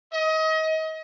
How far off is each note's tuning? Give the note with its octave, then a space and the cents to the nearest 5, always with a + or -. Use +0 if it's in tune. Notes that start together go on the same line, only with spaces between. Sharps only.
D#5 +30